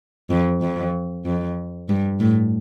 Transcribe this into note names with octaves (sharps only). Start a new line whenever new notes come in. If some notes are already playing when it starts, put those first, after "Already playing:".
F2
F2
F2
G2
A2